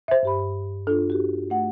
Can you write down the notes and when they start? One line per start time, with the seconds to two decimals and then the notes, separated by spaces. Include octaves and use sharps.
0.08 C5 E5
0.23 G2 G4 B5
0.87 D4 F4 A4
1.10 F#4 G4
1.50 A3 F#5